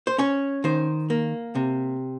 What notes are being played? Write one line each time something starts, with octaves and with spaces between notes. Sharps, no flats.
C5
C#4 C#5
D#3 C5
A#3
C3